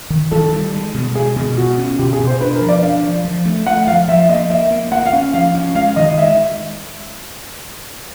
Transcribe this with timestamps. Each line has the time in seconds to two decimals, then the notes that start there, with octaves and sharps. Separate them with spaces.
0.10 D#3
0.31 D#3 A4
0.53 G3
0.74 G#3
0.94 B2
1.15 G#3 G#4
1.36 B2
1.57 B2 F#4
1.78 C#4
1.99 B2 G4
2.13 G#4
2.20 B2
2.27 C5
2.40 D4 B4
2.55 A#4
2.61 F3
2.68 D5
2.82 D4 F5
3.03 F3
3.25 F3
3.46 A3
3.66 A3 F#5
3.87 F3 F5
4.08 F3 E5
4.29 A#3 D#5
4.50 A#3 E5
4.71 A#3
4.92 A#3 F#5
5.06 F5
5.13 C#4
5.34 F3 F5
5.55 C#4
5.75 G#3 F5
5.96 D#3 D#5
6.17 G#3 E5